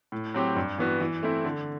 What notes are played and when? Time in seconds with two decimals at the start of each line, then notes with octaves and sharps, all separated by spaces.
0.12 A2
0.34 F#3 C4 G4
0.56 G2
0.78 E3 B3 F#4
1.00 E3
1.23 A3 C4 E4
1.45 D3